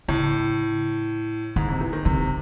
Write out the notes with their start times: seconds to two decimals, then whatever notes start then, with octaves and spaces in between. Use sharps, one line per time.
0.08 A2 C#3
1.56 G#2 D#3
1.68 C3
1.81 E3
1.93 D#3
2.05 C3 D#3